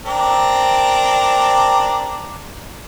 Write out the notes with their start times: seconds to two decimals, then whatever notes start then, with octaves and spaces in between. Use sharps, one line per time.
0.06 C4 D4 A#4